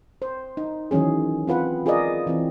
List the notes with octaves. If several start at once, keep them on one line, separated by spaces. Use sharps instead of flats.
C5
D#4
D#3 E3 F#3 C#4 G#4
C4 F4 B4 F#5
F4 G#4 A#4 D5 D#5
E3 C4